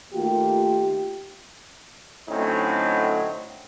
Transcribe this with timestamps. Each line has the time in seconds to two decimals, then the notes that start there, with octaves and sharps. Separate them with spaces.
0.13 D#3 A3 A#3 F4 G4
2.28 A2 D3 F#3 C4 C#4 D#4